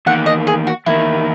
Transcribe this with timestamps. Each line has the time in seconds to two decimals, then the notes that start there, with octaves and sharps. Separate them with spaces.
0.06 E2 D#3 A#3 F#5
0.26 D#5
0.47 G#4
0.67 F#4
0.86 E2 D#3 A#3 E4